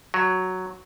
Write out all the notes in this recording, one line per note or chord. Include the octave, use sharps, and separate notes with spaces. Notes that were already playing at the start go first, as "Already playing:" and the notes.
F#3